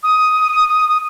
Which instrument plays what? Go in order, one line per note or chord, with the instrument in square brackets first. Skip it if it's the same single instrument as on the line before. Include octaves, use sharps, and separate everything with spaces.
[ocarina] D#6